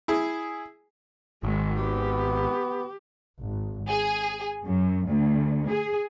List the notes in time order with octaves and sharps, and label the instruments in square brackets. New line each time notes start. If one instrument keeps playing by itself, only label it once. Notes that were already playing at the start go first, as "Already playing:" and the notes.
[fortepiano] E4 G#4
[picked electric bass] G#1 [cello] D#3 G#3
[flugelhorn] B3 [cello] G4
[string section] G#1
G#4
F#2
D2
G#4